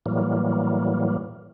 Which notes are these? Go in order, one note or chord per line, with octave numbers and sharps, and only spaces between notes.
A2 E3 F#3 G3 A#3